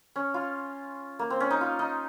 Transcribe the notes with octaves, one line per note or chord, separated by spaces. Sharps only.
C#4
F4
A#3
C4
C#4
D#4
F4
D#4